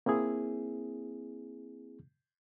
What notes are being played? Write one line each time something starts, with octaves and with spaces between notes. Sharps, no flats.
A#3 C4 E4 G#4